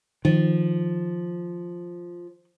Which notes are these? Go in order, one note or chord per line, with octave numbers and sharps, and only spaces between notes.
D#3 F3